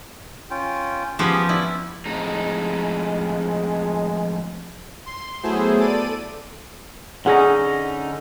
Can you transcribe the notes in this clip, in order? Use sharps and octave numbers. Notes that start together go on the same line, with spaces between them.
C#4 F4 G5
F3 B3 C#4 G4 G#4 G5
E4 D5 B5
F2 A2 G#3 D#4
C6
F#3 A3 B3 E4 G#4 C5
A4 D5 D#7
D3 C#4 D#4 G#4 F#5